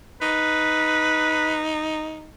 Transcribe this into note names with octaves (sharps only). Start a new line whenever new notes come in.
D#4 B4